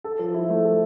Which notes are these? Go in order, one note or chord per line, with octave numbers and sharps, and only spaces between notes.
A4
F3
E4
A3
A4